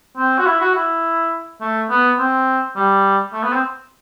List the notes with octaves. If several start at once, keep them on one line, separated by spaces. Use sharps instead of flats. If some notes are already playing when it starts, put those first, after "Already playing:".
C4
F#4
E4
F#4
E4
A3
B3
C4
G3
A3
B3
C4